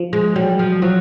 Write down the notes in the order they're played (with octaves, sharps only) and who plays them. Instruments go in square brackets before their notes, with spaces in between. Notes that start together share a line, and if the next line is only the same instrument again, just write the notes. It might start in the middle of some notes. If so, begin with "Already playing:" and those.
Already playing: [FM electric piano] F3
[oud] G#3
[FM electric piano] F#3 [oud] G3
[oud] F3
[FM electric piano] F3 [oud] F#3